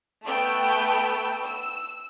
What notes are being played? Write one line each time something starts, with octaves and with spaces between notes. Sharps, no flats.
A3 B3 G5 E6
E6